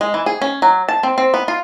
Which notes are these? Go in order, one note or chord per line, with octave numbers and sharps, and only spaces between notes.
G#3
E3
G#4
C#4
F#3
A5
C4
C4
B3
F4